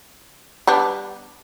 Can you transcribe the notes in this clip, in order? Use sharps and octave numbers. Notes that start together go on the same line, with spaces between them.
G3 B3 D4